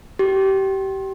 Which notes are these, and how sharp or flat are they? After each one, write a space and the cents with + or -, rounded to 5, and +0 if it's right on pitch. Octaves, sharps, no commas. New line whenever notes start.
G4 -25